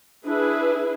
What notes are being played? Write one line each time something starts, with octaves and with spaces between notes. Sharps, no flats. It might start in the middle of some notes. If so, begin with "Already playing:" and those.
D4 E4 G#4 B4